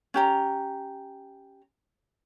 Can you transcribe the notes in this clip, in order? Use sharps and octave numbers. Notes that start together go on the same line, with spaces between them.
C#4 G4 A#5